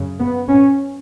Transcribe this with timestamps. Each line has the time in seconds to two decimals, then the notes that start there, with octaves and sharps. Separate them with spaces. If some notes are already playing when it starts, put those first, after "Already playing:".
Already playing: F#2 C#3
0.19 B3
0.48 C#4